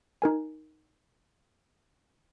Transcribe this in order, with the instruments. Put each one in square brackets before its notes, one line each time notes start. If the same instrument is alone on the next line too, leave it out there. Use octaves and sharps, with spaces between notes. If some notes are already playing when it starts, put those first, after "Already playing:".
[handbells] D#4 A#4 G#5